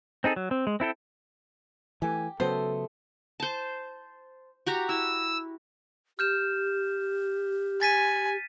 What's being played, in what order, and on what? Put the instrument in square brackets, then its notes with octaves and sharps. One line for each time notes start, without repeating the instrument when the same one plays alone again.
[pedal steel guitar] C4 D#4 G#4 A4
F#3
C4
G#3
C4 E4 A4 G5
[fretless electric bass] E3 A3 [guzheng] G4 [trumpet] G#5
[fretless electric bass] C#3 F#3 B3 [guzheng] A3 D#5 [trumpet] A4 [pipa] C5
[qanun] C5 A5
F#4 G4 A#5
[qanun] E4 [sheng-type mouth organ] E6
[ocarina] G4 [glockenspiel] F6 G6 E7
[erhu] G#5 [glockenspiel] A6 B6 D#7